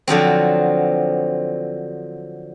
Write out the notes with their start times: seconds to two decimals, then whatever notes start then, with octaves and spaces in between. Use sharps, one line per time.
0.07 D3 F3 F#3 C4